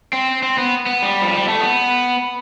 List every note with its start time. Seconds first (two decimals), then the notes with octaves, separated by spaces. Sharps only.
0.13 C4
0.43 C4
0.58 B3
0.86 B3
1.02 G3
1.22 F3
1.35 G3
1.48 A3
1.61 B3